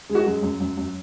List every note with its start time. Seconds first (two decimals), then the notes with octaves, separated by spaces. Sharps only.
0.10 G#3
0.15 F#4
0.26 F#2
0.43 F#2
0.60 F#2
0.77 F#2